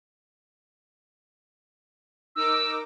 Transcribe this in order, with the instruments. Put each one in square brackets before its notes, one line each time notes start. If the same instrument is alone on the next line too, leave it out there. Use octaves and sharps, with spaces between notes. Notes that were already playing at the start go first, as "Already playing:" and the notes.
[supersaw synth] D#4 A#4 D6 [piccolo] E6